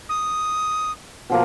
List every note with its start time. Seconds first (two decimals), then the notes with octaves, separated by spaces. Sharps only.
0.09 D#6
1.30 B2 F3 A#3